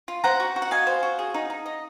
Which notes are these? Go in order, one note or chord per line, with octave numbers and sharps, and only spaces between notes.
F4
C5 F#5 A#5
F#4
F#4
F#5
D#5 F5 G#5
C5
F#4
G#4
D#4
D#4
D#5